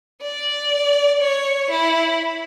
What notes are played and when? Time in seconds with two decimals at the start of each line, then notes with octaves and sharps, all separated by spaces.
0.22 D5
1.21 C#5
1.70 E4